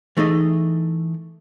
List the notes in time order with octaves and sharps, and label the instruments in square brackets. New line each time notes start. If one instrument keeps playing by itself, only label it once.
[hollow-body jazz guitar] E3 A3 D#4 G#4 D#5